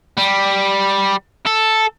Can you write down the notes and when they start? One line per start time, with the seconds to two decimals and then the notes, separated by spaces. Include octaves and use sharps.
0.17 G3
1.47 A4